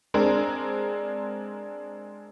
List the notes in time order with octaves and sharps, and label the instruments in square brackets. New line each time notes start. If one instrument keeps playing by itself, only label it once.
[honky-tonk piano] G#3 C4 D4 A#4